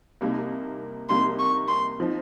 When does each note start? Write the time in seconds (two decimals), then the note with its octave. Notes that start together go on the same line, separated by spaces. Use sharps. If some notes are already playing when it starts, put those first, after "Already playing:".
0.21 C2 C3 G3 A#3 D#4
1.09 C2 C3 G3 A#3 D#4 C6
1.39 C#6
1.68 C6
2.00 F3 C4 D#4